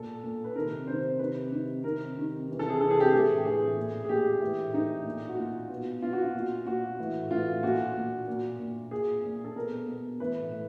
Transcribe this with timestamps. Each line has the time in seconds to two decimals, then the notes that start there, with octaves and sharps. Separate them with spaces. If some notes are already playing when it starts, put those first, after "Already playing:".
Already playing: A#2 A4
0.23 A#2
0.44 B4
0.56 C3 D#3 A#4
0.87 C3 D#3 C5
1.19 C3 D#3 B4
1.52 C3 D#3
1.84 C3 D#3 A#4
2.16 C3 D#3
2.48 C3 E3
2.59 A4
2.70 G#4
2.81 C3 E3 A4
2.91 G#4
3.00 G4
3.10 A2 E3 G#4
3.45 A2 E3 G#4
3.77 A#2
4.04 G#4
4.09 A#2 G4
4.41 A2 E3
4.74 A2 E3 D#4
5.05 A#2
5.29 F#4
5.38 A#2 F4
5.70 B2
6.02 B2 F4
6.13 F#4
6.22 F4
6.34 A#2
6.66 A#2 F#4
6.98 A2 E3
7.30 A2 E3 F4
7.63 A#2 F#4
7.95 A#2
8.28 A#2
8.59 A#2
8.91 A#2 G#4
9.24 A#2
9.44 A4
9.56 B2 A#4
9.88 B2
10.20 A2 E3 B4
10.52 A2